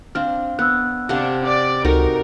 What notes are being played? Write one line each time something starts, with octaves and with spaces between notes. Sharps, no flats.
C4 D4 F5 F6
B3 E6 F#6
C3 D4 F5 F#5
D5
C#2 D#4 F#4 A4 A#4